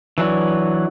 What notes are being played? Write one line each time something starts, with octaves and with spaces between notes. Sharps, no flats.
E3 F#3 D4